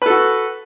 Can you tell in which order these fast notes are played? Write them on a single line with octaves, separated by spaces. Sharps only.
B4 A4 F#4